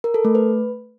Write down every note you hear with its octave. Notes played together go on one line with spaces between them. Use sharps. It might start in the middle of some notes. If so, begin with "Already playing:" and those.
A#4
A4
A3
B4